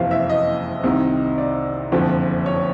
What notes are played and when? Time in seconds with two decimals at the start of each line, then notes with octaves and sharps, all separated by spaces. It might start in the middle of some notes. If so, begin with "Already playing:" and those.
Already playing: F#1 F2 C3 E3 F5
0.11 E5
0.30 D#5
0.83 C2 C3 D#3
1.38 D5
1.92 F#1 F2 D3 F3
2.46 C#5